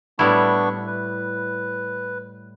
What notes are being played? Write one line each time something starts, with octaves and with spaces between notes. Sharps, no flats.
A2 G3 B3 D4 E4 C#6
B4